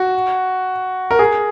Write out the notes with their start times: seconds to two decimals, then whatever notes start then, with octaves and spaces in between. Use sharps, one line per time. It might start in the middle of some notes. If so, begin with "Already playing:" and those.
Already playing: F#4
1.11 A#4
1.19 G#4